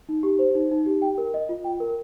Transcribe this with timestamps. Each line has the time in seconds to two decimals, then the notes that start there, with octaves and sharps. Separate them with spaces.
0.09 D#4
0.23 G4
0.39 C5
0.55 D#4
0.71 D#4
0.86 G4
1.02 G5
1.18 A#4
1.34 D#5
1.49 F4
1.64 G5
1.80 A#4